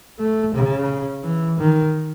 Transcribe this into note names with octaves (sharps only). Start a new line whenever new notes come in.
A3
C#3
E3
D#3